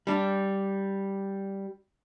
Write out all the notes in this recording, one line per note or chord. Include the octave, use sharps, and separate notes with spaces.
G3 D4